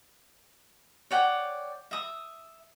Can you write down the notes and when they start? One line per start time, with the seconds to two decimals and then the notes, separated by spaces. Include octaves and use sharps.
1.11 C#5 D5 F#5 G5
1.91 E5 D#6